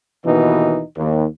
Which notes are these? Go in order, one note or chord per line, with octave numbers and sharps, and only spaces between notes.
D#2 B2 E3 D#4
D#2